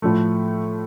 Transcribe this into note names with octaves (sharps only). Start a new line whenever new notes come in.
A2 F3 A3